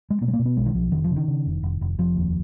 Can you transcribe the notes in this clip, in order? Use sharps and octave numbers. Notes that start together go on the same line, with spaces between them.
G#3
B2 A#3
G#3
A#3
B2
B3
B1 G#3
D#3
B1 F3
F1 D#3
F3
C#3
D#3
C#3
F1
F1
F1
F1 F3
D#2